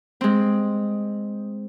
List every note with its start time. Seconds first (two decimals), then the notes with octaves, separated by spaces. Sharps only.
0.21 G#3 C4